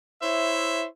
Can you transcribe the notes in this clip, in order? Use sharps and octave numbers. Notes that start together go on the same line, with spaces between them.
E4 C5 C#5 E5